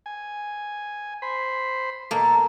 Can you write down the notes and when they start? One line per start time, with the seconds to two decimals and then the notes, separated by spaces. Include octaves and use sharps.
0.06 G#5
1.22 C5 B5
2.11 B2 A#3 A4